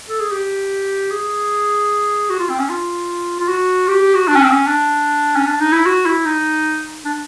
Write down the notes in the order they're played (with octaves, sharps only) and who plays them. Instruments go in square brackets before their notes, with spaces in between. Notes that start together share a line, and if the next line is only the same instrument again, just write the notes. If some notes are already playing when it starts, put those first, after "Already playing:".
[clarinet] A4
G#4
G4
G#4
F#4
F4
C4
C#4
F4
F4
F#4
G4
G4
F#4
D4
C#4
C4
C#4
D4
C#4
D4
D#4
E4
F#4
E4
D#4
D4